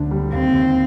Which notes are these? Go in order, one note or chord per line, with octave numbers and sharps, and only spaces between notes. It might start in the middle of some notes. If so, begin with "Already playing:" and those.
Already playing: D2 D3 D4
G3
D#2 C4
D#2